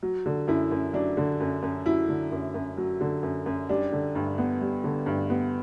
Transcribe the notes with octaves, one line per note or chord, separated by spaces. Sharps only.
F#3
D3
F#2 E4
F#2
F#3 D4
D3
F#2
F#2
F#3 E4
D3
F#2
F#2
F#3
D3
F#2
F#2
G3 D4
D3
G2
B3
G3
D3
G2
B3